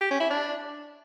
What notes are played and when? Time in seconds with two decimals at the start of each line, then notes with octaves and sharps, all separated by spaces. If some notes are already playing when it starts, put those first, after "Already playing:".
0.01 G4
0.11 C#4
0.21 E4
0.30 D4